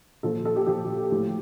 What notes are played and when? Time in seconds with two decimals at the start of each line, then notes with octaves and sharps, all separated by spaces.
0.23 A#2 F3 A4
0.45 A4
0.56 G4
0.66 A#2 F3 G4
1.11 A2 F3